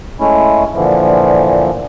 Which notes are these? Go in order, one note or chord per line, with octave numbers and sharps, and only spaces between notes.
G#3 A3 C#4 E4
A#2 D3 E3 F3